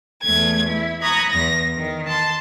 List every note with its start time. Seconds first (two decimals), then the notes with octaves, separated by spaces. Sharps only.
0.22 E2 A3 G#6
0.67 E4
1.02 A#5 B5 C#6 D#6 F#6 G#6
1.30 E2 A#6
1.76 D#3
2.08 A5 C6